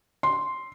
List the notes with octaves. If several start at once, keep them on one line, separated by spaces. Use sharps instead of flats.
C6